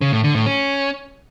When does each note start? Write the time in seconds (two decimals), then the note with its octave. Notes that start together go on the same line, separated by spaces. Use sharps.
0.01 C#3
0.13 A2
0.24 D3
0.35 A2
0.46 C#4